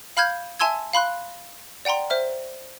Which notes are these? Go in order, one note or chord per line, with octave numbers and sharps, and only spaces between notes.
F5 B5 F6 G6 G#6
E5 G#5 A5 C6 E6 G#6
F5 B5 C6 F#6
D5 F#5 G5 A#5 C6
C5 E5 F6